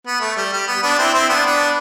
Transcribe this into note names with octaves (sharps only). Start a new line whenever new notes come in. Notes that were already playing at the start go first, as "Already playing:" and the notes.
B3
A3
G3
G3
B3
B3 D4
C4 E4
C4 E4
B3 D4
B3 D4